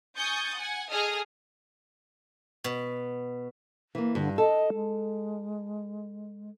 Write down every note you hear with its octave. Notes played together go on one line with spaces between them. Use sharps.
G#5 C#6 D#6 G6 A6
F#5 G#5
G#4 A4 D#5 D#6 F6
B2
E3 A#3
G2 D3
A4 D#5
G#3